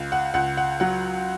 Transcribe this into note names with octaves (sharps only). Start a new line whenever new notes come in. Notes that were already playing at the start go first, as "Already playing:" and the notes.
Already playing: C#2
F#5
C#2 F#5
F#5
F#3 F#5